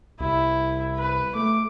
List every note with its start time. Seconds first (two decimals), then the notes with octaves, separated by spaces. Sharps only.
0.20 C2 E4
0.96 B4
1.35 A3 D6